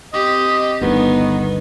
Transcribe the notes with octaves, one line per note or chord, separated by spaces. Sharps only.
C4 G4 D#5
G1 D2 D#3 B3